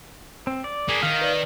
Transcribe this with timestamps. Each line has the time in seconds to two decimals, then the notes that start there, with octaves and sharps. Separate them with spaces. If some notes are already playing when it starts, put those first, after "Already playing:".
0.47 C4
0.64 D5
0.89 A#3 G#4 D#6 B6
1.03 D#3 F5
1.21 B4 D5